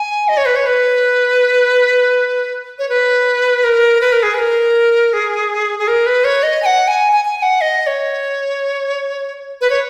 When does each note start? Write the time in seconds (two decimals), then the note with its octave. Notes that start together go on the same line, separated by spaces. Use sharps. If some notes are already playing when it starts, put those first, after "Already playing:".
Already playing: G#5
0.28 D#5
0.37 C#5
0.46 B4
0.56 C#5
0.66 B4
2.79 C#5
2.89 B4
3.64 A#4
4.01 B4
4.12 A#4
4.23 G#4
4.34 B4
4.39 A#4
5.13 G#4
5.79 G#4
5.88 A#4
6.06 B4
6.24 C#5
6.43 D#5
6.62 G#5
6.66 F#5
6.88 G#5
7.12 G#5
7.25 G#5
7.37 G#5
7.42 F#5
7.61 D#5
7.87 C#5
9.61 B4
9.70 C#5